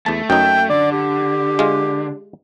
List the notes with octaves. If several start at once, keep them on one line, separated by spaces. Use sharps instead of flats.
E2 A3 A5
F#2 D#4 G5
D3 D5
G4
G#3 F4